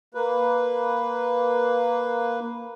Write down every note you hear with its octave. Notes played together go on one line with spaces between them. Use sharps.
A#3 B4